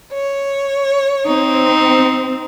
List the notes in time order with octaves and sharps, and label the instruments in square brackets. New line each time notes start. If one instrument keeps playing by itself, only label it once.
[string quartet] C#5
[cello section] C4 [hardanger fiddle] D#4